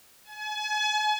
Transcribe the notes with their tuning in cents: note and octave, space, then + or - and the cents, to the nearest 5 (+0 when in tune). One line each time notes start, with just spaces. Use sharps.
G#5 +40